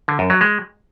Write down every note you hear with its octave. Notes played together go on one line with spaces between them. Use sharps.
D3
F#2
F#3
G#3